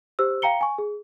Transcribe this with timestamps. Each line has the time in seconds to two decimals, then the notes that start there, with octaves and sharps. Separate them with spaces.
0.19 G4 C5 E6
0.42 F5 G5 A#5 C#7 G7
0.61 G#5 C#6
0.78 G#4